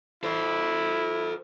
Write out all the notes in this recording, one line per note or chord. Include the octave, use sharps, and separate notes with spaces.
E4 A4 C5